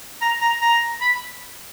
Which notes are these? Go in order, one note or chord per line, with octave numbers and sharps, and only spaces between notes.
A#5
A#5
A#5
B5